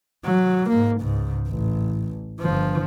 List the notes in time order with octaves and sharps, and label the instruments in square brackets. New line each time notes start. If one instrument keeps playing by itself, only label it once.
[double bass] F#3
G#2 A#3
C#2 G#2
A1
G1 F3